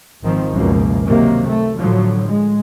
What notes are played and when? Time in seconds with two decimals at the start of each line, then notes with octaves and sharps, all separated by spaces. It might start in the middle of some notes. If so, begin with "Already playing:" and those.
0.22 G#1 D#3 F3 C4
0.51 C#2 F#2 B2 E3 F3 A#3
1.06 C3 D#3 F#3 A#3
1.47 A3
1.77 A2 D3 F3 F#3
2.28 G#3